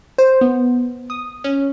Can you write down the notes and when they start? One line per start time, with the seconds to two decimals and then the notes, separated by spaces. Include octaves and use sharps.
0.18 C5
0.41 B3
1.10 D#6
1.44 C#4